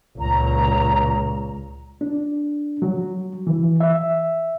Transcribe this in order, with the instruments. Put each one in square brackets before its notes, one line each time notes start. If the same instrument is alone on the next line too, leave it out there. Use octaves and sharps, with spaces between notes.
[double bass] C#2 A#2 [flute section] A#5
[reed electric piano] D4
F#3
E3
E5